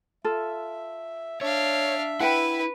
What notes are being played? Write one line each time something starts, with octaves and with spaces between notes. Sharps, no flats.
F4 A4 E5
D4 C#5 E5 F5
E4 B4 F#5 G5